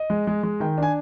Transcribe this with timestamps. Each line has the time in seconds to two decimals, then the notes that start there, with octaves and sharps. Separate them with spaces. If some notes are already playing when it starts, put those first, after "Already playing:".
Already playing: D#5
0.10 G#3
0.27 G#3
0.43 G#3
0.60 D#3 G5
0.78 D4 G#5